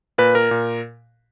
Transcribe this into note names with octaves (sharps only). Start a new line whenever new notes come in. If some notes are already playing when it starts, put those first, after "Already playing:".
A#2 B4
A#4
A#2